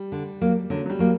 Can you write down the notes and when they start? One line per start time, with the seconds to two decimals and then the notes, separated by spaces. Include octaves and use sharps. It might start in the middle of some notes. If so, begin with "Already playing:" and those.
Already playing: G3
0.12 D3
0.41 F#3 A#3
0.70 D3 F#3
0.86 F#3
0.90 G3
0.99 F#3 A#3